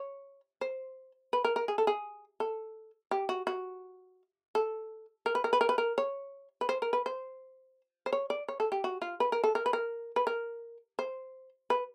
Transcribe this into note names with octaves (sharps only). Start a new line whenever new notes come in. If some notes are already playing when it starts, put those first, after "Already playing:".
Already playing: C#5
C5
B4
A#4
A#4
G#4
A4
G#4
A4
G4
F#4
F#4
A4
A#4
B4
A#4
B4
A#4
B4
A#4
C#5
B4
C5
A#4
B4
C5
C5
C#5
D5
C#5
A4
G4
F#4
F4
B4
A#4
A4
A#4
B4
A#4
B4
A#4
C5
B4